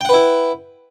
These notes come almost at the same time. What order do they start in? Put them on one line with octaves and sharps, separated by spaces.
G5 F#5 B4 E4